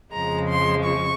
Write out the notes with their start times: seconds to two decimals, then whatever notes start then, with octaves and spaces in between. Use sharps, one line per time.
0.13 F2 C#3 F3 G#3 A#5
0.49 C6
0.85 C#6